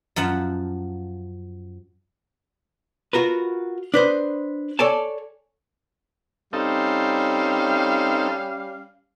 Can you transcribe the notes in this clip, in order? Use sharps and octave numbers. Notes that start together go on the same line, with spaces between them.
F#2 F3 F#5 A5
F4 F#4 A#4 B4
D4 B4 C5 D#5
A4 C#5 D5 G#5 A5
G3 C4 C#4 D#4 A4 F5